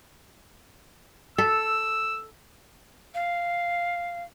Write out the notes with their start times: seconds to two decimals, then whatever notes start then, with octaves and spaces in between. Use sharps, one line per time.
1.38 A4 E6
3.14 F5